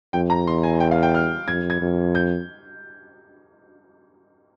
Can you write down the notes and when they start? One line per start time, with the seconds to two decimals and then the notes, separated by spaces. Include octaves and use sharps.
0.13 F2 G5
0.30 A#5
0.47 E2 C6
0.63 G#5
0.80 G5
0.91 F5
1.03 G5
1.14 F6
1.47 F2 G#6
1.70 G#6
1.81 F2
2.15 G6